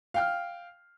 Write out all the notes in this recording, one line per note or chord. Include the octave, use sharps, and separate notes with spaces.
F5 G5 F6